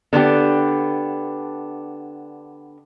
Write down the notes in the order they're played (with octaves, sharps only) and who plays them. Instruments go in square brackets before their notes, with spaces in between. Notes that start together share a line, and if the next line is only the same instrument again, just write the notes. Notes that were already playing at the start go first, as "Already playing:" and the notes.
[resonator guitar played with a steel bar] D3 B3 D4 G4